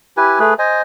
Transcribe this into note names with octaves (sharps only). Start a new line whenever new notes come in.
E4 G4 B4 G#5
A3 G#4 B4
C5 D#5 G#5